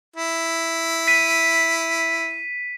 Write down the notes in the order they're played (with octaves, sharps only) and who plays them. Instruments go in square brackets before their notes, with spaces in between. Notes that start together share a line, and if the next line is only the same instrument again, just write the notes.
[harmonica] E4
[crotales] B6 D#7